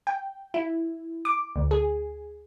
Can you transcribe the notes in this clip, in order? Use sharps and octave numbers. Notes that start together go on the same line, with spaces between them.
G5
E4
D6
D2
G#4